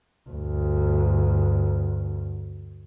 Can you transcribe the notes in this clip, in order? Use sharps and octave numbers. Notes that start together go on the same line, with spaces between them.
D2 G2